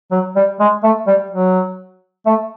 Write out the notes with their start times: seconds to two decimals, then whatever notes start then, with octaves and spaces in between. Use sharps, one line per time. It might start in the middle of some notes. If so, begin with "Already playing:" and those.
0.11 F#3
0.36 G3
0.60 G#3
0.84 A3
1.07 G3
1.31 F#3
2.26 A3